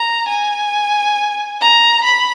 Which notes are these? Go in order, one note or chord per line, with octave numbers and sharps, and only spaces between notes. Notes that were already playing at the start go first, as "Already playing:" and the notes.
Already playing: A#5
G#5
A#5
B5